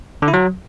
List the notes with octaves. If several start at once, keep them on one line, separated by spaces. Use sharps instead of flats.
D3
E4
F#3